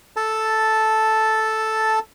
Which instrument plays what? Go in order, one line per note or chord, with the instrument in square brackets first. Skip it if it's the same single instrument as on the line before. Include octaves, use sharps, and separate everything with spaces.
[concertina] A4 A5